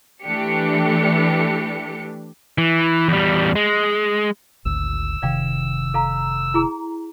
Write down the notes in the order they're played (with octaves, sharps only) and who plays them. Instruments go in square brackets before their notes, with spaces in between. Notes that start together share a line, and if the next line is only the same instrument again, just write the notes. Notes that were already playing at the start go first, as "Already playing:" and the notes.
[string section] E3 A3 D4 G4 C#7
[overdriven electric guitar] E3
E2 G3
G#3
[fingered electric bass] G#1 D2 [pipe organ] E6
[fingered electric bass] F1 C3 D#3 [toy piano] D5 F5 G5
[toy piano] A4 F5 A#5
E4 G#4 A#5